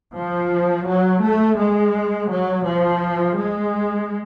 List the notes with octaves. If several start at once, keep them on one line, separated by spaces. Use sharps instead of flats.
F3
F#3
A3
G#3
F#3
F3
G#3